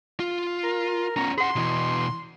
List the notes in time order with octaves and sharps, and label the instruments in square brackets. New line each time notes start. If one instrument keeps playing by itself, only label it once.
[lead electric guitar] F4
[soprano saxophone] A#4
[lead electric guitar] B3 C#4 [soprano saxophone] A#5
[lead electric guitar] G#4 F#5 [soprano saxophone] C6
[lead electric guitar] B2 E3